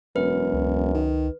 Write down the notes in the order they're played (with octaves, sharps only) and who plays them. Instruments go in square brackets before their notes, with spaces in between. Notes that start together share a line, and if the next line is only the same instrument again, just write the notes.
[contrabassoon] E1 [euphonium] F#2 [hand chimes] B4
[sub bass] C#2
[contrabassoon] D#3